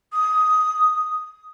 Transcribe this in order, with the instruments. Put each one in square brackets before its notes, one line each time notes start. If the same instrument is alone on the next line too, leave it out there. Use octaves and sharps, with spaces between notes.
[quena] D#6